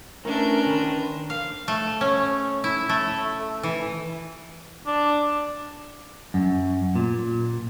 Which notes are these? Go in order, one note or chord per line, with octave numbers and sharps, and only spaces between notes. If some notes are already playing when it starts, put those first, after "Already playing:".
E3 A3 C#4 D4 A#4
D#3 B4 C5
F5
A3
C#4
E4
A3
E3
D4
F#2
A#2